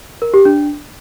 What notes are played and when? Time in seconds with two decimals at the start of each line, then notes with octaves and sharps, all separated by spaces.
0.22 A#4
0.34 G4
0.45 D4